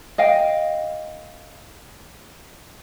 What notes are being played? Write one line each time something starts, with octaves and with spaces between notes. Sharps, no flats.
D#5 F5 G5